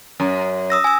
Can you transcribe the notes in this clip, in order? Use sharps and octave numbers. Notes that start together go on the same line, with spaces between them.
F#2
D#6 E6 A#6
G#5 E6